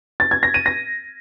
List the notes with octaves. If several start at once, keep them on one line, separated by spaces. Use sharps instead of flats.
A6
G#6
A#6
D#7
A#6